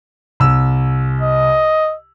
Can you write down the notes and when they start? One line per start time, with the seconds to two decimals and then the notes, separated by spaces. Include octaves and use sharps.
0.40 C2 E6
1.21 D#5